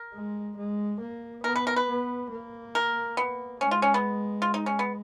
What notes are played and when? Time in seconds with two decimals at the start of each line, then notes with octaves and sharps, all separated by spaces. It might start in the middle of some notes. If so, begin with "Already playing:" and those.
Already playing: A#4
0.14 G#3
0.57 G#3
1.01 A#3
1.44 B3 A#4
1.56 B4
1.67 A#4
1.76 B4
1.88 B3
2.31 A#3
2.75 A#4
3.17 B3
3.61 G#3 C#4
3.71 F4
3.82 C#4
3.94 B3
4.42 F4
4.54 D#4
4.66 C#4
4.79 B3